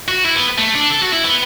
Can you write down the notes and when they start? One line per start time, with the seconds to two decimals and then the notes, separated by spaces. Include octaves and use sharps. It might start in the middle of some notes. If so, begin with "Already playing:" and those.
0.08 F#4
0.25 E4
0.35 B3
0.58 A3
0.74 D4
0.90 A4
1.02 F#4
1.13 E4
1.24 B3